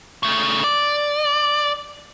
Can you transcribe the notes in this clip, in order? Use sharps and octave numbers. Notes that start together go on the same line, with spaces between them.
C#3 A3
D5